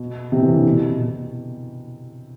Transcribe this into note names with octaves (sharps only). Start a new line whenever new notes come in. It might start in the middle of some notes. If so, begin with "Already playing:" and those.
Already playing: B2
C3
E3
D3
B2
B2